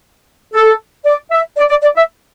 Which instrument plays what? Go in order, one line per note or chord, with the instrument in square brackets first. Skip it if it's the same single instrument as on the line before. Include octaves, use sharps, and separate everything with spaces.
[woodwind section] A4
D5
E5
D5
D5
D5
E5